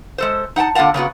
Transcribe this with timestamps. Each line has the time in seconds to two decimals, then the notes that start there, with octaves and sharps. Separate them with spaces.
0.18 G#3 A4 C5
0.56 D#4 F#5 G5 A5
0.75 D3 A#3 F4 F5 F#5 A5
0.94 C#3 A#3 B3 F#4